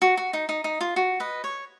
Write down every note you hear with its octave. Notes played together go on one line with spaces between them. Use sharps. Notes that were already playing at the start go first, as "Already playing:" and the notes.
F#4
F#4
D#4
D#4
D#4
F4
F#4
B4 D#5
C#5